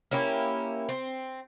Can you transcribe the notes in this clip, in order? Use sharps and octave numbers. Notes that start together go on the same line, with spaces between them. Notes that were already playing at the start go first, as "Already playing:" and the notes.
A#3 C#4 E4 G4
C4